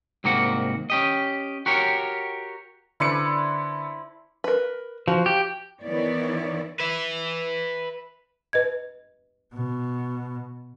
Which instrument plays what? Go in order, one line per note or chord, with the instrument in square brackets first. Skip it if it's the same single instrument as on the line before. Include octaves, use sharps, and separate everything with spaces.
[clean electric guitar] C2 G#2 D#3 A#3 F#4 F#5
C#4 G4 D#5
F#4 G4 A#4 C#5
[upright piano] D3 B4 C#7 [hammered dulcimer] E4 C5 D5
[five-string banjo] A#4 B4
[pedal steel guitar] F3 [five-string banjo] F#4
[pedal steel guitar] G4
[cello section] D#3 E3 B3 E4 C#5 D5
[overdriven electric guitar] B4 E5
[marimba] B4 D#5 G#6
[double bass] B2